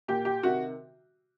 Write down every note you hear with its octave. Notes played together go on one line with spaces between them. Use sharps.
A#2 G4
G4
C3 D#3 F#4